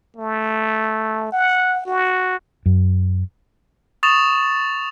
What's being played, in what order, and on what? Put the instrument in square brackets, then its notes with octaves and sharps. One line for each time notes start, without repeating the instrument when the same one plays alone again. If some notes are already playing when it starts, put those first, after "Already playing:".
[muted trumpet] A3
F#5
F#4
[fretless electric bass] F#2
[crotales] C#6 D#6 A6 E7 F7